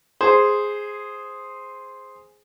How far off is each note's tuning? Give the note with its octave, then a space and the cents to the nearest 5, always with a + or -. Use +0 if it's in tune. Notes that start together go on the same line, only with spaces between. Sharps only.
G#4 +0 C5 +0